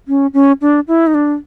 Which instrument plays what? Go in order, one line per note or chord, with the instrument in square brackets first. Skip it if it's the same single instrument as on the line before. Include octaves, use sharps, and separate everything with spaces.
[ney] C#4
C#4
D4
E4
D#4
D4